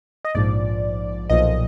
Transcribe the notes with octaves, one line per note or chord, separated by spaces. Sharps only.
D#5
A#1 G#2 F3 D5
B1 A#2 F3 D#5